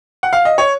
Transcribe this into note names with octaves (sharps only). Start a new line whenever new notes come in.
F#5
F5
D#5
C#5